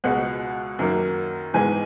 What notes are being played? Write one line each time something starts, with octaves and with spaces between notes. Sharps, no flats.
C#2 B2 G#3 B3 F#5
F#2 D#3 F#3 A#3
G#2 E3 G#3 B3 G#5